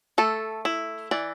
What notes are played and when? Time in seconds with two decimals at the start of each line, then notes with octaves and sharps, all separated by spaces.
0.18 A3 A4
0.65 E4
1.11 E3 D5